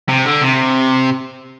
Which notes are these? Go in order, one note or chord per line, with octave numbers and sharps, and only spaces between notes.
C3
D3
C3